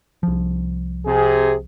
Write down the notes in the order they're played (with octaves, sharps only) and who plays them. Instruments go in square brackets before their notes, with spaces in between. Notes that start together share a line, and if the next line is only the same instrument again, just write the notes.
[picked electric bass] C2 F3
[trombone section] C3 G#4